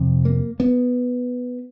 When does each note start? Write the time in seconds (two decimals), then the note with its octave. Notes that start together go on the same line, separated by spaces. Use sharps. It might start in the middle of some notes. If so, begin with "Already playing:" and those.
Already playing: F2 C3
0.25 A#3
0.60 B3